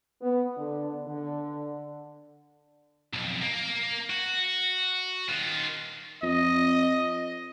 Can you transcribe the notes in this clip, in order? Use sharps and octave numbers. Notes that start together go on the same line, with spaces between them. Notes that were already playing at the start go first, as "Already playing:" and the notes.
B3
D3
D3
B1 F2
A#3
F#4
D#3 F4
F2 D#5